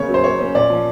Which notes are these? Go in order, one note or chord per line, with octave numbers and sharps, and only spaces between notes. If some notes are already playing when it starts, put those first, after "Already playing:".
Already playing: C#3 A#3 C#4 C#5
F#3
C5
A#3 C#5
C#4
A#2 D5
F3